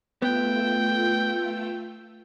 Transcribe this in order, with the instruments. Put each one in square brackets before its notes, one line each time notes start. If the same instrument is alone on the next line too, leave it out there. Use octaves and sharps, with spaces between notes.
[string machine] A3 F4 E6 [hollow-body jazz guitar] B3 [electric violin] G5